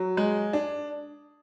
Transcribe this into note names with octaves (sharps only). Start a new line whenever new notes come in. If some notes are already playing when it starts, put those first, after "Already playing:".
Already playing: F#3
G#3
D4